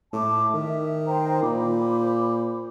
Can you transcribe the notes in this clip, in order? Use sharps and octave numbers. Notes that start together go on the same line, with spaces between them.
A2 E5 A5 D6
D#3 E5
C5 G5 A#5
A#2 C5 B5 D6